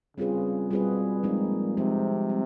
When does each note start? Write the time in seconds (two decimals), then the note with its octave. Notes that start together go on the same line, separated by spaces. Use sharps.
0.17 C#3 G3 C4 F4 G#4 B4
0.71 B2 G3 C4 F4 G#4 B4
1.23 A#2 F3 G#3 C4 D#4
1.77 C3 F3 G#3 C4 D#4
2.30 G3